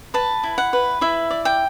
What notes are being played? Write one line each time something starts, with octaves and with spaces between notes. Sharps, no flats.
B4 A5
E4
F#5
B4
E4 E5
D5
G5